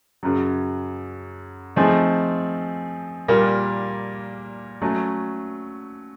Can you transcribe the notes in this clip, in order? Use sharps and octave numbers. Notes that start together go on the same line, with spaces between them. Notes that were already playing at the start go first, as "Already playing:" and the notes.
F#2 C#3 F#3
F3 A3 C4 D#4 G#4
A#2 G3 A#3
F#3 A3 C#4